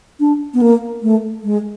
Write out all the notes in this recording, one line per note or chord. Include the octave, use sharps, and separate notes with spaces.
D4
B3
A#3
A3
G#3